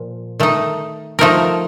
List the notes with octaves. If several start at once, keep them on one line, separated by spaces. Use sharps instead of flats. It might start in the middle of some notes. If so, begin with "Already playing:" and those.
Already playing: A#2 F3
D#3 A3 D#4
F3 A3 D#4 A#4